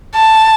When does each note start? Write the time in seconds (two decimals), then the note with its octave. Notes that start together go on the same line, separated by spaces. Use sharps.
0.15 A5